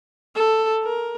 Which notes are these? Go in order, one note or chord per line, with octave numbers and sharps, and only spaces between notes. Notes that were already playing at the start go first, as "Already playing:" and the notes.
A4
A#4